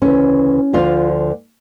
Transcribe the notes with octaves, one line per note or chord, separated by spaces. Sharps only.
D2 C#3 E3 C#4
D2 D3 F3 F4